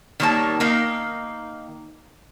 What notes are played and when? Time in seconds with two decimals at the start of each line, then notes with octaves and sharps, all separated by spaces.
0.20 D#3 G3 A#3 C#5 A5
0.60 D#3 A#3 D#4